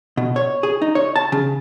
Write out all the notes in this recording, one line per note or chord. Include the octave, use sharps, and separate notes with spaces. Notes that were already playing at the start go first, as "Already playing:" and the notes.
B2
C#5
G#4
D#4
C#5
A5
C#3